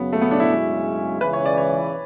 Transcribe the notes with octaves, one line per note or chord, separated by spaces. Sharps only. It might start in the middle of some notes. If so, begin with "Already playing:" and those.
Already playing: F#2 C#3 F#3 B3
A3
B3
D4
E4
F#2 C#3 G#3 C#4 F#4
C#2 C#3 E3 B4
C#5
D5
C#5